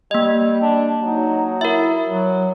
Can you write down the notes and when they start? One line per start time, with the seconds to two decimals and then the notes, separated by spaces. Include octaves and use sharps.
0.11 G3 A#3 D#5
0.62 D4
1.02 F#3 D#4
1.61 E4 A#4 E5
2.07 F#3